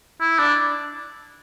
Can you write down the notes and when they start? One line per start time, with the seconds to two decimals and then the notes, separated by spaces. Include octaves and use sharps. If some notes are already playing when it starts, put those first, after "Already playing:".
0.21 E4
0.39 D4